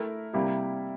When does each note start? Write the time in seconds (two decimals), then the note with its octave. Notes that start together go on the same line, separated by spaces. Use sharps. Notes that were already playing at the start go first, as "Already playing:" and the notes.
Already playing: A3 E4 A#4
0.33 C3 G3 A#3 E4